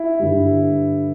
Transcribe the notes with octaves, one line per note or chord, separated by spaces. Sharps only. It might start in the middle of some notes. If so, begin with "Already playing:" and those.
Already playing: E4
G2 D3 G3